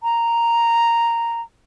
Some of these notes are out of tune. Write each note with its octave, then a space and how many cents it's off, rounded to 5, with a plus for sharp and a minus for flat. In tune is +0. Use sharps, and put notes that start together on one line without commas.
A#5 -5